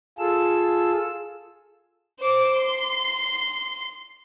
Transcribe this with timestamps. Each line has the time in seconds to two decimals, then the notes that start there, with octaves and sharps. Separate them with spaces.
0.18 F4 G#4 A4 E6
2.20 C5 D6
2.55 C6